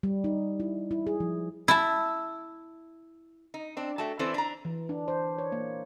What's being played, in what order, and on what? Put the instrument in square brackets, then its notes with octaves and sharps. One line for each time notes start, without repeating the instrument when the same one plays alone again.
[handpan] G3
D#4
E4
E4
G#4
F3
[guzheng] E4 A5
[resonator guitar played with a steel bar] D#4
C4 D4
A3 F#4 G5 A5
E3 C4 E4 A4 C5 D5
D4 A#5
[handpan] E3
D4
C5
C#5
A#3